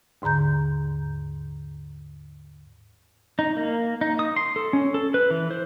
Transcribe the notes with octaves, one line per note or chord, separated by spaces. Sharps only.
D#2 G#2 D3 A#5 G6
D#4
A#3
D#4
D#6
C6
A4
C#4
A4
B4
E3
C5